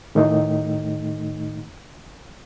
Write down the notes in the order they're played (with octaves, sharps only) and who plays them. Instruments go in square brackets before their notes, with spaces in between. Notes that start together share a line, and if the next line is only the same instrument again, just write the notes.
[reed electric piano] A2 D#3 A3 D#4